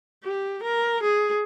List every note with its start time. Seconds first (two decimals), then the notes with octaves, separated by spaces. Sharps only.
0.24 G4
0.63 A#4
1.03 G#4